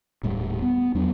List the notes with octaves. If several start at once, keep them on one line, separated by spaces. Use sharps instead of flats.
D#1 A2 G3
B3
E2 F#3 B3 D4